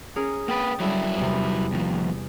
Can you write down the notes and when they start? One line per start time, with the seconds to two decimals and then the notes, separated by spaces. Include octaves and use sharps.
0.16 C#4 G#4 A#4
0.48 A#3 B4 G5 D#6 A6
0.80 F#3 G3 E4 A4 C#5
1.17 E2 C3
1.73 D#2 F3